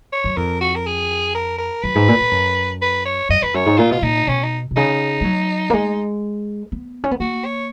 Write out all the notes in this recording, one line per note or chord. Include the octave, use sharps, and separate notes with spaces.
C#5
F#2
F2 A#4
F#4
A#4
G#4
A#4
A#4
F#2 B4
G#2
A#2
A#2
F#2
B4
C#5
F#2 D#5
F2 B4
F#2 C#5
G#2
A#2 F4
B2 F4
A#2 D#4
B2 C#4
D#4
B2
C#3 D#4
G#3
F#3
A#3
G#3
B3
C#4
B3
A#3 F#4
C#5